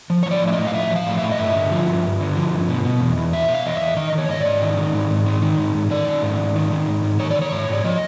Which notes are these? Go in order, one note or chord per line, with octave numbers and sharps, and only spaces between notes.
F3
C#5
F3 D5
A2
E5
D#5
A2
F5
F3 E5
F3
F5
A2
A2 E5
D#5
G2 E5
D3
F3
G2
G2
D3
F3
G2
B2
B2
E2
E2
B2 E5
B2
F5
E2 D#5
E2 E5
D#3 D#5
D#3
C#5
G#2 D#5
G#2 D5
D#3
D#3
G#2
G#2
D#3
D#3
G#2
G#2
D#3 D5
D#3
G#2
G#2
D#3
D#3
G#2
G#2
D#3 C#5
D#3 D5
C#5
G#2
G#2 D5
F3 D#5